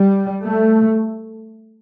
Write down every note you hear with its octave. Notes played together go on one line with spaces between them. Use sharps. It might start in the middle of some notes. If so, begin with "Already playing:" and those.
Already playing: G3
A3